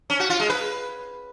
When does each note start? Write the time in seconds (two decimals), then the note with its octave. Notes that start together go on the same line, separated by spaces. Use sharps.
0.10 C#4
0.20 F#4
0.30 F4
0.40 G#3
0.50 B4